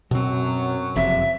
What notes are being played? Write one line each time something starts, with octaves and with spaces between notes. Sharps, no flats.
F#2 B2 F#3 C4
F#1 F2 C3 E5